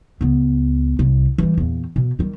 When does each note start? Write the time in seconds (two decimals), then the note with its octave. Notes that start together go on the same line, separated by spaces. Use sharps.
0.21 C#2 B3
0.99 C2
1.38 E3 G3
1.57 E2 A#2
1.96 B2
2.19 D#3 G3